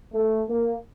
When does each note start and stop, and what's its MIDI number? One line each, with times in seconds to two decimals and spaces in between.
0.13 0.42 57
0.49 0.75 58